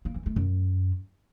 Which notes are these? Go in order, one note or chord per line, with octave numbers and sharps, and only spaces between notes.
A#3
E3
A3
F#2